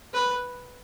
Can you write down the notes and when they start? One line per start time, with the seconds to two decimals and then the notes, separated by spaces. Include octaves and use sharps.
0.13 B4